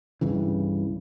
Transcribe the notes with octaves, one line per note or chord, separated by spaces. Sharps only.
C2 G2 C#3 E3